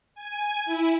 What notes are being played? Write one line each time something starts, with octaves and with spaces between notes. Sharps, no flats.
G#5
E4